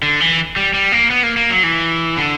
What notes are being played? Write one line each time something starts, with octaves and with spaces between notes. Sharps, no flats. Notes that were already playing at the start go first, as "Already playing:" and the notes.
D3
E3
G3
G3
A#3
B3
A#3
A#3
F#3
E3
D3